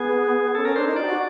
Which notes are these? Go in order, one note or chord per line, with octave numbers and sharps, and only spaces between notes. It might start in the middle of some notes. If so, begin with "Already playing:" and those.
Already playing: B3 G#4
C#4 A4
C#4 A#4
D4 C5
D#4
F4 D5
G4
F#4